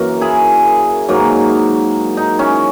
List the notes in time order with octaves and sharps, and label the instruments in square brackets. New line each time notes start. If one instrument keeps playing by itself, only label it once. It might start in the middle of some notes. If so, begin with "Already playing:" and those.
Already playing: [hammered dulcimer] F#2 E3 A#3 F#4 A#4
E4 G#4
G#2 F#3 A#3
D#4
C#4 E4